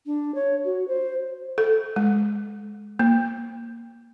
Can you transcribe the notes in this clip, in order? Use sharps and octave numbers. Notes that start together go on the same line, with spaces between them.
D4
C#5
F#4
C5
A4
G#3
A#3